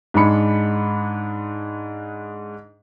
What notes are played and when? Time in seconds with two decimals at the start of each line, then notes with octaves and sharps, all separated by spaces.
0.14 G#2 G#3 D4 B5 C#7